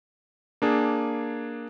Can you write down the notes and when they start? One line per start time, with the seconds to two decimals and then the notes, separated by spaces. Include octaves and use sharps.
0.62 A#3 D4 G#4